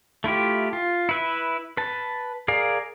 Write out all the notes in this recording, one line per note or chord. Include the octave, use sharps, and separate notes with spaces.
A3 E4 F4 G4
F4
E4 B4 E5
B4 A5
G#4 A#4 D5 F5